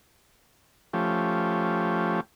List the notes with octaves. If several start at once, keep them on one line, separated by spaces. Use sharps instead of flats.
F3 A3 C#4 G4